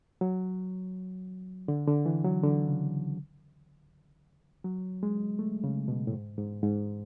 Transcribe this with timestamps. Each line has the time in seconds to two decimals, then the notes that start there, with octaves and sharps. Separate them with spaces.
0.21 F#3
1.68 D3
1.87 D3
2.06 E3
2.24 F#3
2.43 D3
2.68 C#3
4.65 F#3
5.03 G#3
5.39 A3
5.64 C#3
5.88 B2
6.07 A2
6.13 G#2
6.38 G#2
6.62 G#2